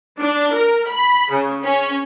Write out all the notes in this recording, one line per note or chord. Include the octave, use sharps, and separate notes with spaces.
D4
A#4
B5
C#3
C#4